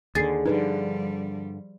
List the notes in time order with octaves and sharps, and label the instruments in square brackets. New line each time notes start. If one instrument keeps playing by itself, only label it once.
[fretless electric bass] D#2 D3 [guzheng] G#4 [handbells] A6 C7
[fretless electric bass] G2 D3 [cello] F3 G3 [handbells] D#4 B4